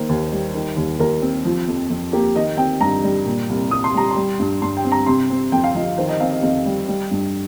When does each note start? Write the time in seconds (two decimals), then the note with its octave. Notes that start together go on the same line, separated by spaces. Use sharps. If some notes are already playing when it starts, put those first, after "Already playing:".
Already playing: D#3 A#3 C5
0.09 D#2
0.32 G3
0.55 D#3
0.76 D#2
0.99 D#2 A#4
1.22 C4
1.45 F3
1.68 F2
1.90 F2
2.13 A#3 G4
2.35 D#3 D#5
2.57 C4 G5
2.81 G2 A#5
3.04 G3
3.25 A#2
3.49 C2
3.71 C2 D#6
3.84 C6
3.94 G3 A#5
4.11 C6
4.16 G3
4.39 G2
4.62 G2 C6
4.77 G5
4.84 C4
4.92 A#5
5.06 C3 C6
5.30 C4
5.52 F2 G5
5.64 F5
5.75 F3 D#5
5.98 D#3 C5
6.09 D#5
6.20 C4 F5
6.31 D#5
6.42 F2 D#5
6.66 G3
6.88 G3
7.11 G2